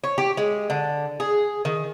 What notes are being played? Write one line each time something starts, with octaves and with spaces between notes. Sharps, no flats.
C#5
G4
G#3
D3
G#4
D#3